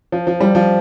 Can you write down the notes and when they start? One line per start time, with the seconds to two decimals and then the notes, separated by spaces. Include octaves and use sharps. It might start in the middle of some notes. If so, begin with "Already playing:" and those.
0.12 F3
0.27 F3
0.40 G3
0.55 F3